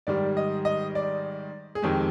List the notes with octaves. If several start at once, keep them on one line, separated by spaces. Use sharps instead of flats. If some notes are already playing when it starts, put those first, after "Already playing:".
G#2 D#3 G3 D5
D#5
D#5
D5
G#4
F2 D#3 G#3 G4